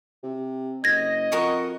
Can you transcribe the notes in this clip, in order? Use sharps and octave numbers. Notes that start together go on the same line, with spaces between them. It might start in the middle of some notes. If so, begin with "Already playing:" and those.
C3
F#1 D#5 G#6 A#6
F2 F#4 A#4 C#6